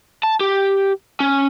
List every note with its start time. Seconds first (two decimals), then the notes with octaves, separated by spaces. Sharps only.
0.23 A5
0.41 G4
1.20 C#4